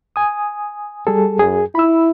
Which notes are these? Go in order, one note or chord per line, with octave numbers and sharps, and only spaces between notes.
G#5 D#6
G3 G#4 A4
F#2 G#4
E4 B5 E6